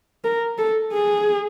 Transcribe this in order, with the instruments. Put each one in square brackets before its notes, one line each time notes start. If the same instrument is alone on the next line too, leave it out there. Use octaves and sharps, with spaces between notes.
[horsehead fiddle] A#4
A4
G#4